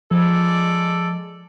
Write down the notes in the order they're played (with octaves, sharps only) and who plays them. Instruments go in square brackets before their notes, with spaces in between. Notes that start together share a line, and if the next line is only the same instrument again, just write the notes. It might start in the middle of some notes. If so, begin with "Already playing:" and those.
[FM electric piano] F3 [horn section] G#3 A4 D5